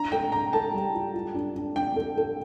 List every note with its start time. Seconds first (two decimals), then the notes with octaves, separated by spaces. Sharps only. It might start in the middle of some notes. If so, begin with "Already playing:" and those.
Already playing: D4 A#5
0.12 A4 G5
0.32 D4 A#5
0.53 A4 A5
0.73 G3
0.94 F4
1.15 F4
1.35 D4
1.56 D4
1.76 D4 G5
1.96 A4
2.17 A4